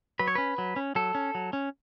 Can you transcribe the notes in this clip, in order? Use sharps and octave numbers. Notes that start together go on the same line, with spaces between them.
F#3 B4
C#5
C#4 B4
F#3
C#4
F#3 A4
C#4
F#3
C#4